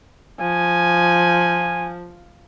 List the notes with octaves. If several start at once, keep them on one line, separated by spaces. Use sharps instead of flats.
F3 G#5